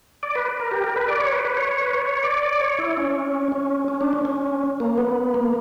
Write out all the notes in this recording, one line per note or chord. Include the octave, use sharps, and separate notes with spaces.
D5
B4
A#4
G4
A#4
B4
D5
C#5
B4
B4
C#5
C#5
B4
C#5
C#5
D5
D5
C#5
E4
C#4
C#4
C#4
D4
C#4
C#4
A#3
B3
A#3